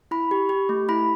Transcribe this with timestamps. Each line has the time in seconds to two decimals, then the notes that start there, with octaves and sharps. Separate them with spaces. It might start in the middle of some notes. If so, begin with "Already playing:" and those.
0.11 E4 B5
0.31 G4
0.49 G4
0.69 A3
0.89 E4 B5